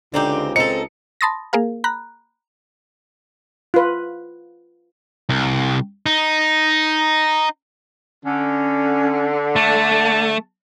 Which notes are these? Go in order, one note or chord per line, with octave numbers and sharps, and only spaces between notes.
C#2 D3 C4 D#4 G4
C4 D#4 A4 C#7
A5 B5 C6 D#6 A6 A#6
A#3 G#4 A#4 F5
A#5 B5 F#6
F4 B4
C2
D#4
D3 C#4
A3 A5